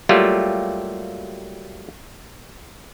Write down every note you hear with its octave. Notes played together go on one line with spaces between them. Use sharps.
F#3 G3 A3 A#3 F4 G4